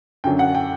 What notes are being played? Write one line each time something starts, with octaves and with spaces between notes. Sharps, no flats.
F#2 D3 F#3 G5
F#5
G5